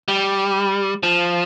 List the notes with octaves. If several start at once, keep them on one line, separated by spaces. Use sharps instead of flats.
G3
F3